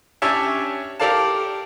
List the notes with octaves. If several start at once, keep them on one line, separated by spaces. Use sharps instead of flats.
C#4 D4 G4 C#5 E5 A5
G4 A4 A#4 D5 F5 A5